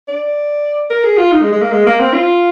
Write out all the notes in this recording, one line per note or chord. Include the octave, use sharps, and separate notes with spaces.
D5
A#4
G#4
F4
D#4
G#3
G#3
A#3
G#3
A#3
C4
F4